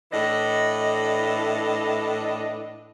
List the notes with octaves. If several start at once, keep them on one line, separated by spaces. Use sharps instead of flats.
A2 E3 D4 A4 D#5